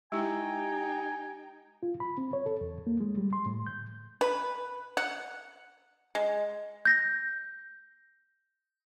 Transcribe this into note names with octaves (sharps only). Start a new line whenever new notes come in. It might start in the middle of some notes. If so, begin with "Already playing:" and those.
G#3 D#4 E4 G4 G5 G#5
F4
B5
C4
C#5
A4
E2
A#3
G#3
G3
C6
A2
G6
B4
F#5
G#3
G6 A#6